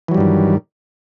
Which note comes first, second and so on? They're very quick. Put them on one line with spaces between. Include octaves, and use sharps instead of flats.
E3 F#3 G3 G2 D#3